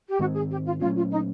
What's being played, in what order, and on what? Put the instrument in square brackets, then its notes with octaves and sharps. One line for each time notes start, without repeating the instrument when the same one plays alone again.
[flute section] G4
[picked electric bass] G#2 D#3 G#3 C4 [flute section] F#4
[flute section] G#4
G4
F4
[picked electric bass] A#2 F#3 A3 C#4 [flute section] F4
[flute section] F4
D#4